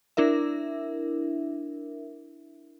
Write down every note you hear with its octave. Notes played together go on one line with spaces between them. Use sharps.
D4 E4 A#4 E5